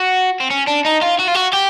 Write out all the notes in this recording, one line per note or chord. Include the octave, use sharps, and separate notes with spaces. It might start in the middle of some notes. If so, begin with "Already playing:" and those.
Already playing: F#4
C4
C#4
D4
D#4
F4
F#4
F4
F#4
G4